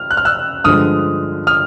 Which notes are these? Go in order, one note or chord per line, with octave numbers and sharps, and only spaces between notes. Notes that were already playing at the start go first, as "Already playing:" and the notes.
Already playing: F6
F#6
F6
E6 F#6
G2 D3 F3 G#3 D#6 F6
D#6 F6